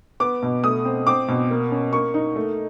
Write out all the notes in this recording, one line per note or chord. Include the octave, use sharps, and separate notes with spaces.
B3 D6
B2
A3 D#6
C4
C4 D6
B2
A#3
C#4
A#3 C#6
D#4
A3